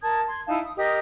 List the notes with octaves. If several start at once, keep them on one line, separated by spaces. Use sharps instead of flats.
A#4 A5 D#6 G#6
C6 G#6
D#4 E4 F5 A5
D#6
G4 A#4 D#5 D#6